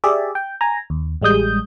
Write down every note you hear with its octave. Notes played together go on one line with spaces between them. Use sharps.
G4 G#4 D5 E5
G5
G#5 A#5
D#2
A1 G3 G#3 D#6 G6